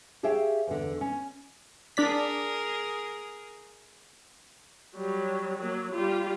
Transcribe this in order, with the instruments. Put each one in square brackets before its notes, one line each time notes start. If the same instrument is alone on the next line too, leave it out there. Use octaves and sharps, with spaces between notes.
[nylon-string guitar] G4 G#4 C#5 E5 F5 G5
E2 D3
C#4
[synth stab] D4 D5 B6 [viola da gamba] G#4 A#4
[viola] F#3 G3
F#3 A#3
G3 F4